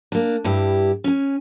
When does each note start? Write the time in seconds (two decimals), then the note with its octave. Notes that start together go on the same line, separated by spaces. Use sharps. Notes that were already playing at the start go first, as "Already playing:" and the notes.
0.12 A#3 D4
0.44 G2 E4 G4
1.04 C#4 G#5